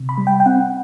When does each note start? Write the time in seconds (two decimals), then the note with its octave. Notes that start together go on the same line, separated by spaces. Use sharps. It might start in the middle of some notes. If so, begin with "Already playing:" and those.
Already playing: C3
0.09 B5
0.18 G3
0.27 G5
0.40 G5
0.46 C4 F#5